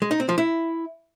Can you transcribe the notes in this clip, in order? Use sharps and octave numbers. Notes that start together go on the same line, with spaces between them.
G#3
D#4
C4
F3
E4